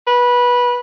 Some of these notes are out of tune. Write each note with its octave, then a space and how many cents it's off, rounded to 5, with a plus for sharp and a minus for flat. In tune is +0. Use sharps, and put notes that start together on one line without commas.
B4 -15